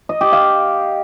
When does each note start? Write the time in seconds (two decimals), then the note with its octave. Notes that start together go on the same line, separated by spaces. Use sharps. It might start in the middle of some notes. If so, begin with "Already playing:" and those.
0.09 D#5
0.21 G4
0.32 F5